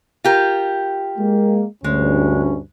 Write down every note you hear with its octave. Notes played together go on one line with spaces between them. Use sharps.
F4 G4 A#4
G#3 A#3
D2 G2 G#3 C#4